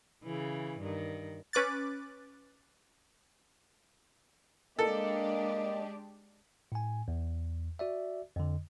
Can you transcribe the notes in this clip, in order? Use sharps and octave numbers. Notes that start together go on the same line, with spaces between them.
C#3 E3
G2 D#3
C#4 B4 D6 F#6 A6
G#3 A#3 D4 G4 A4 D#5
A2 G#5
E2
F#4 D5 E5
F2 D3